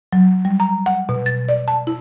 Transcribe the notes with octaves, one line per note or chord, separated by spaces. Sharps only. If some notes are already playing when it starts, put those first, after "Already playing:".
F#3
G3
A#5
F#5
B2
A6
D5
A5
E4